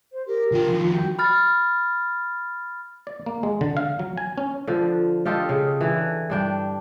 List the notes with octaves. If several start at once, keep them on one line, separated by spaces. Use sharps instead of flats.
C5
G4 A#4
D3 F4 G5
F2 D#3
F#4 G5
B5 F6 A6
D5
A#3
G#3
D3
F5
F#3
G#5
C#4
D3 F3
F4 G4 A4 D#5
C#3
D3 E3
G2 D4 G5